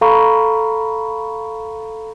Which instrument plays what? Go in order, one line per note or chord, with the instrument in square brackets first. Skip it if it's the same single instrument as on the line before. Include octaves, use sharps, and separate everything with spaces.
[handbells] A4 F5 A#5 B5 C#6